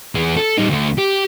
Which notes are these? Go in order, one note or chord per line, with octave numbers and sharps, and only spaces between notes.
E2 G#4
A4
G3 D#4
D2 A3
G4